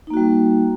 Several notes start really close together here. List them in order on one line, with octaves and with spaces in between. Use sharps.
D#4 A#3 F#4 G3